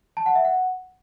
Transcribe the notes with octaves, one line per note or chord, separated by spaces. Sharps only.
A5
F#5
E5
F#5